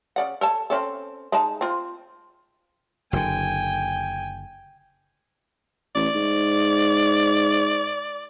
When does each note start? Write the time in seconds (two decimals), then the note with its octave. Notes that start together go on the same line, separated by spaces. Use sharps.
0.16 C#3 D5 F#5
0.41 A4 C#5 A5
0.70 C4 C#4 A4
1.32 G#3 D#4 A5
1.61 C4 F4
3.13 F#1 D3 G5 G#5
5.95 A1 D5
6.15 G#2